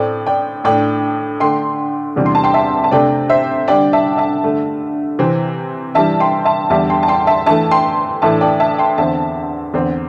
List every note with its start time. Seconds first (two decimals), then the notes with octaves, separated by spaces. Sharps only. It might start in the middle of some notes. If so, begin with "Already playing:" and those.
Already playing: A2 A3 C4 D5 G5
0.27 D5 G5
0.64 A2 A3 D4 D5 G5
1.40 D3 A3 D4 G5 C6
2.16 E2 C3 E3 G3 D4
2.26 C6
2.35 A5
2.44 G5 C6
2.54 E5 A5
2.84 A5
2.91 C3 A3 D4 D5 G5
3.30 C5 E5
3.68 D3 G3 D4 D5 G5
3.93 E5 A5
4.17 E5 A5
4.43 G2 D3 A3
5.19 C3 E3 C4
5.94 G2 E3 G3 E5 A5
6.20 G5 C6
6.45 E5 A5
6.70 E2 D3 G3 D4 E5 A5
6.90 G5 C6
7.03 A5
7.08 G5 C6
7.27 E5 A5
7.46 G2 E3 A3 E5 A5
7.71 G5 C6
8.22 A2 E3 A3 D4 E5 A5
8.41 D5 G5
8.60 E5 A5
8.78 G5 C6
8.98 E2 D3 C4 E5 A5
9.74 E2 D3 C4